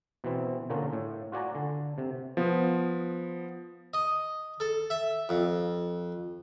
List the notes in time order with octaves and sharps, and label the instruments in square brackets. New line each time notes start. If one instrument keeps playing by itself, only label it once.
[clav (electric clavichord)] B2 E3 C4
A#2 D3 C#4 F4 A#4
A2
F4 F#4 D5 G#5 A#5
D3
C3
[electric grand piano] F3 B3
[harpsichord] D#5
A4
E5
F2